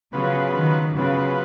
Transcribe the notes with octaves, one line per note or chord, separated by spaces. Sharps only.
C#3 F#3 B3 F4 B4
D#3
C#3 F#3 B3 F4 B4